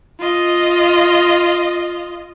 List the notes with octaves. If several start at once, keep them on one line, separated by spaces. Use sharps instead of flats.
F4 D#5